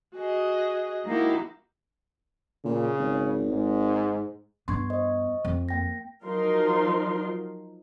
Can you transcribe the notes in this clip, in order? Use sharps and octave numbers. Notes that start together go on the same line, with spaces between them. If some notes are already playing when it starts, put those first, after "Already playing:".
F#4 G#4 D#5
G#3 A#3 D#4 E4 F#4 G4
A#2 C#3
G#1
G#2
G2 B3 C6 C#6 G#6
C5 D#5 C#6
F2
A#3 G5 A#6
F3 F#3 D#4 F4 A#4 C6